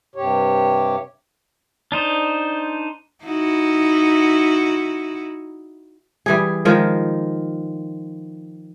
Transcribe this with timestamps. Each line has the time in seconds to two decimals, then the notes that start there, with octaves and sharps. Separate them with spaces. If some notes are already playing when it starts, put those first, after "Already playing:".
0.15 G2 C3 G4 C#5
1.92 D4 D#4 C5
3.24 D#4 E4 F#4
6.26 E3 G3 G#4
6.65 D#3 F3 G#3